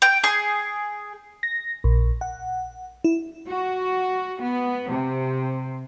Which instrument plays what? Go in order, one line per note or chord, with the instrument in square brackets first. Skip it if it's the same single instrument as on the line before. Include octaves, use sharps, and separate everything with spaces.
[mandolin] G5
G#4
[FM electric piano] A#6
A#1
F#5
E4
[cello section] F#4
B3
C3